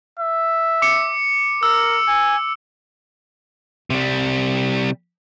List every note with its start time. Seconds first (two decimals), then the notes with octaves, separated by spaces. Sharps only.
0.19 E5
0.82 D6 C#7
1.63 A#4 E6
2.08 G#5
3.90 C3 G3